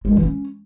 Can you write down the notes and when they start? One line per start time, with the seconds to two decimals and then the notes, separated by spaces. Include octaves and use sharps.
0.05 G#3
0.11 D4
0.17 E3
0.23 C#4